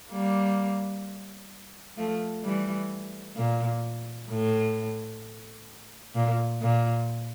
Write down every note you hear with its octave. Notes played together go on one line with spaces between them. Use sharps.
G3 A#3
F3 A3
E3 G3
A#2
A2
A#2
A#2